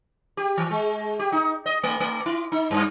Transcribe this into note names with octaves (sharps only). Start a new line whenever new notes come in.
G4
E3
G#3
G4
D#4
D#5
A3
A3
E4
D#4
G2